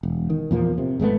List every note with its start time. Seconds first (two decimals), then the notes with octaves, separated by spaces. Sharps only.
0.03 E1
0.30 D#3
0.51 E2 A#2 F3 A#3
0.78 C3
1.00 G#1 G#3 A3 B3